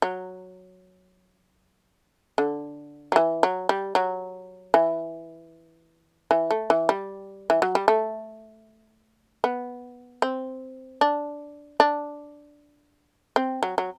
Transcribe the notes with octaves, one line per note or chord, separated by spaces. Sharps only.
F#3
D3
F#3
E3
F#3
G3
F#3
E3
E3
A3
E3
G3
E3
F#3
G3
A3
B3
C4
D4
D4
C4
F#3
F#3